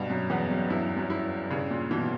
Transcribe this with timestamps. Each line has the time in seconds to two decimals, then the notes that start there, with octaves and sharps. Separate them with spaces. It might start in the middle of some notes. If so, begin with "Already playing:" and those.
Already playing: G2 B2
0.10 F#2
0.30 E2 B3
0.51 F#2
0.70 G2 E4
0.97 F#2
1.10 E4
1.51 G2 C#3
1.70 A#2
1.91 B2 E3